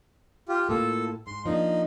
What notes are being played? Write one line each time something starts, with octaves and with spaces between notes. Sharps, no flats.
F4 G4
A2 A#3 F4 A4
G#2 C6
F3 A#3 D4 D#4